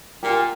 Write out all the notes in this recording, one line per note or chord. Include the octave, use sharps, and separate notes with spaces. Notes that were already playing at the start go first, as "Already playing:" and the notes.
A#2 G4